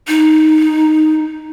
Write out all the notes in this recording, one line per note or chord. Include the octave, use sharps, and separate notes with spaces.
D#4